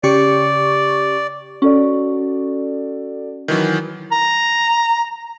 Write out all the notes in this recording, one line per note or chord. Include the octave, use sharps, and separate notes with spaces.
C#3 G4 D5 C#6
C#4 F#4 A4 D5
D#3 E3 F#3
A#5